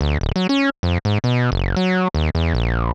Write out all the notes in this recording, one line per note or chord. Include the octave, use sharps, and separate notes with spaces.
D2
D1
F#3
C#4
F2
G#2
B2
F#1
F#3
D#2
E2
A#1